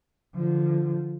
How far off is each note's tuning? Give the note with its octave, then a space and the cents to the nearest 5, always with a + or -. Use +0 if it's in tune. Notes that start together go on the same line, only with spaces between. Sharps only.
D3 +0 F3 -20